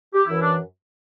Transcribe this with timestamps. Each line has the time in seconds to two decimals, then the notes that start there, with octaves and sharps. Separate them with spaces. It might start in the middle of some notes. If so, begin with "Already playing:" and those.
0.14 G4
0.26 F#2 E3 E4
0.42 D4